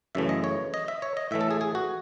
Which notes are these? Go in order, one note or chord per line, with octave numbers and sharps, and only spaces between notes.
F#2 C#3 E3 A3 E5
D#5
C#5
D#5
E5
C#5
D#5
A2 E3 A3 E5
A4
G#4
G#4
F#4